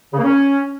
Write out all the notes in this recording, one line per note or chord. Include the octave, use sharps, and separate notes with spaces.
C#3
A#3
C#4